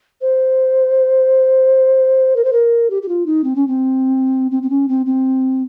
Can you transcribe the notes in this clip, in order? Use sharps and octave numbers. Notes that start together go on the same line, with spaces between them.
C5
A#4
C5
A#4
G4
G4
F4
D#4
C4
C#4
C4
C4
C4
C#4
C4
C4